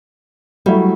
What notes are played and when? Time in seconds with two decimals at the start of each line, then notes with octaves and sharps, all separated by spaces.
0.66 F#3 G3 A3 E4